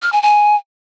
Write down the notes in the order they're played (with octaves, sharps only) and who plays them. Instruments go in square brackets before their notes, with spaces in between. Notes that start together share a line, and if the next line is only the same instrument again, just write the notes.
[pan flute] F6
G#5
G#5